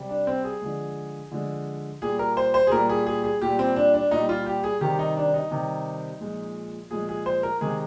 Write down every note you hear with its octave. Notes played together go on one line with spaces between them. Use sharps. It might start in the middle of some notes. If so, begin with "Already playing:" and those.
Already playing: C3 G3
D4
C4
G#4
D3 F3 G#3
D3 F3 G#3
A#2 G3 G#4
A#4
C5
C5
G#4
A#2 G3 A#4
G#4
G#4
G#4
A#2 G3 G4
C4
D4
D4
A#2 G3 D#4
F4
G4
G#4
C3 D#3 G3 G4
D#4
D4
D#4
C3 D#3 G3
A#2 F3 G#3
A#2 F3 G#3 G#4
G#4
C5
A#4
C3 D#3 G#3 G#4